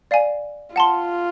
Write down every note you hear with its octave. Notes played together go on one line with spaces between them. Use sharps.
D5 F5 G#5
F4 F#5 A5 C6